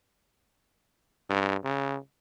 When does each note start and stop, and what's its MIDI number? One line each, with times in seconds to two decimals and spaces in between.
1.29 1.56 43
1.64 1.97 49